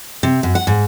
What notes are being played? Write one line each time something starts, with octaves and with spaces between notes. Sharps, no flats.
C3
F#2
F#5
G#2